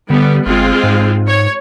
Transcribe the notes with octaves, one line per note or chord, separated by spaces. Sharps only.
D3 G3 B3
G1 G#3 C4 F4
G#2
C#5